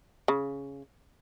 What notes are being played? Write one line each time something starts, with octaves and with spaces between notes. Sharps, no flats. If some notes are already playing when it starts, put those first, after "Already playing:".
C#3